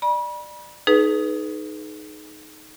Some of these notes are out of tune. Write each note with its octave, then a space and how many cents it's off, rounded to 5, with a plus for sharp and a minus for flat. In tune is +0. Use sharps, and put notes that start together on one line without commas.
D5 +25 B5 -40
D#4 +0 G#4 +35 B4 +0